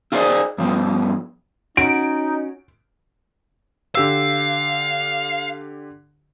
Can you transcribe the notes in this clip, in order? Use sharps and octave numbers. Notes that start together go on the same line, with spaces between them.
E4 F4 G#4 C5 D5 D#5
G2 F3 B3
C#4 D#4 F#4 D7
D3 G4 F5 E6